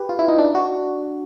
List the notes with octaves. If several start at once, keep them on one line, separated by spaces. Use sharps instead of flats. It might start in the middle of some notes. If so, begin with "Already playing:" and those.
Already playing: G4 B4
F4
E4
D#4
D4
F#4